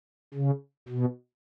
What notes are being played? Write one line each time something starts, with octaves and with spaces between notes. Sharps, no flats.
C#3
B2